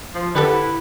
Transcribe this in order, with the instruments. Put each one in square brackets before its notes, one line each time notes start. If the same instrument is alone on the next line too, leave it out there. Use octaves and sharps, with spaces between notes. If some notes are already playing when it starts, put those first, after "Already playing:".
[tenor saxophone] F3
[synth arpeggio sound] D3 G4 A4 [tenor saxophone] B4 [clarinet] F#5
[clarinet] E4